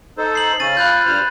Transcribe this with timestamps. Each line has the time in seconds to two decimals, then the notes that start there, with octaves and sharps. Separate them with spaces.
0.18 D#4 A4 C5
0.35 C7 F#7
0.60 C#3 C#4 A6 D#7
0.77 F4 B5 F#6 G6
1.06 G2 C5 F6